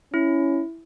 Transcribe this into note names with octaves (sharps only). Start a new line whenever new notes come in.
C#4 E4